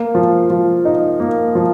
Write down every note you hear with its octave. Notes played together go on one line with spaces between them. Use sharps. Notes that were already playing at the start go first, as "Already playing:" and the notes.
Already playing: A#3
F3
F3
D#4
A#3
F3